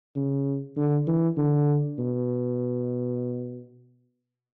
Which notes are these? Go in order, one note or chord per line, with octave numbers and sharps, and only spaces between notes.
C#3
D3
E3
D3
B2